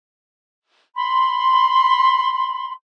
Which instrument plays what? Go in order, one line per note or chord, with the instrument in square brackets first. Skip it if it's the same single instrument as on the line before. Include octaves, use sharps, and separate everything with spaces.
[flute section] B5 C6